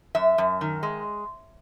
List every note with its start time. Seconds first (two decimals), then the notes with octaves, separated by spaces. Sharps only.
0.15 F#2 E5
0.38 F#2
0.61 D#3
0.83 G#3